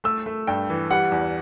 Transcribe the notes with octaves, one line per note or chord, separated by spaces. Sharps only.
A3 E6
A3
G2 G5
E3
G3 F#5
E2